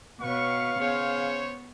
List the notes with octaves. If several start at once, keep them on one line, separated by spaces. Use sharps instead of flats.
B2 B4 C#5 F5 C#6
C#3 B3 C5 C#5